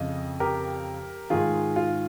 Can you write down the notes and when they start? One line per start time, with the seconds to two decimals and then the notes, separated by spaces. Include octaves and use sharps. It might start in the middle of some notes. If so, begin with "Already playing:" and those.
Already playing: F2 C#3 D#5
0.40 G4 A#4
1.30 G#2 D#3 F4 G#4
1.76 F4